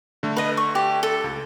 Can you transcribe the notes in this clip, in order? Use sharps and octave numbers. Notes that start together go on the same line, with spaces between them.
D3 A3
B4 D#5
C#6
G4
A4
C#2